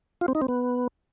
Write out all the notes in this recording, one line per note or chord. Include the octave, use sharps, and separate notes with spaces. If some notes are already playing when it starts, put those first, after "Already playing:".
F4
C4
D#4
C4
B3